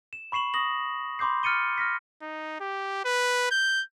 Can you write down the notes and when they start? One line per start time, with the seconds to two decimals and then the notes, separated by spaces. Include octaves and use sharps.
0.13 E7
0.32 B5 C#6 C7 E7 F#7
0.54 C#6 D#6 A#6 F#7
1.19 B5 C6 D6 G6 C7
1.43 F6 A6 C#7 D#7 G7
1.78 F6 A#6 B6
2.21 D#4
2.60 G4
3.05 B4
3.51 G6